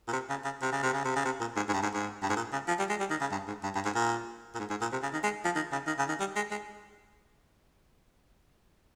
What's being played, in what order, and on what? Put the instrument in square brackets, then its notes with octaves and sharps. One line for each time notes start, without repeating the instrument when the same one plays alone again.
[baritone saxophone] A#2
C3
C#3
C#3
C3
C#3
C3
C#3
C3
C#3
C3
A#2
G#2
G#2
G2
G#2
G#2
G2
G#2
A#2
C#3
F3
G3
G#3
G3
D#3
C#3
G2
G#2
G2
G2
G#2
A#2
A#2
G#2
G#2
A#2
C3
C#3
D#3
G#3
F3
D#3
C#3
D#3
C#3
D#3
G3
G#3
G#3